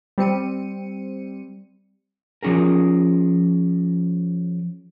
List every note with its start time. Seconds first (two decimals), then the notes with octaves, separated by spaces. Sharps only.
0.18 G3 C4 C#7 D#7
2.43 F3 G#3 C#4 G#4 A#4